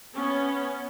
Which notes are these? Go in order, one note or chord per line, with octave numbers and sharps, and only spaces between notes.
B3 C#4